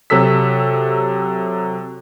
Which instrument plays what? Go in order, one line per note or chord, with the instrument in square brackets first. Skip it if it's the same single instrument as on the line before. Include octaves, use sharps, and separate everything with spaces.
[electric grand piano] C3 F#3 A4 E6 B6